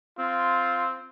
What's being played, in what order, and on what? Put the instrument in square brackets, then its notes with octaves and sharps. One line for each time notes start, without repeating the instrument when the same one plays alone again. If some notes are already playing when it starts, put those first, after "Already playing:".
[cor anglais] C4 [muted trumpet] F4